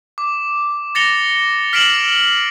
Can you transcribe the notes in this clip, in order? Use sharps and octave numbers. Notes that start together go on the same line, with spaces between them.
D6
A6 A#6 C#7 F7 G7
F6 B6 C7 D7 E7 F#7